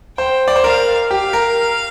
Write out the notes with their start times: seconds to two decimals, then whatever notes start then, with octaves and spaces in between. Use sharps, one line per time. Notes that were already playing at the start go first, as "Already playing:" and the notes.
0.18 C5 G5
0.48 D5
0.56 C5
0.64 A#4 F5
1.10 G4 F5
1.33 A#4